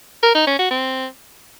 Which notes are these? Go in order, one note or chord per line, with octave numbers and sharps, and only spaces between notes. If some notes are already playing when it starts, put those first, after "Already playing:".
A#4
D#4
C#4
F#4
C4